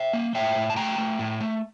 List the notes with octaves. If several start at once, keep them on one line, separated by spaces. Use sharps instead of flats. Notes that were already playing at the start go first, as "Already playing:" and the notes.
Already playing: E5 G5
A#3
A2 E5 G5
A2
A5
A3 G5 A#5
A3
A2
A3